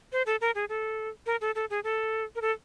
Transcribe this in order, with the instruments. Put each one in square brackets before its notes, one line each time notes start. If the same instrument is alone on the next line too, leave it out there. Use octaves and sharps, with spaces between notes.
[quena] C5
A4
A#4
G#4
A4
A#4
A4
A4
G#4
A4
A#4
A4